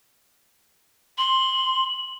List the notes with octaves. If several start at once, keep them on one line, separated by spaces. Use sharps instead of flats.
C6 F#7